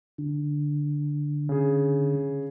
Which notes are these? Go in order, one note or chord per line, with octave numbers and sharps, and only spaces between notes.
D3
C#3 G#4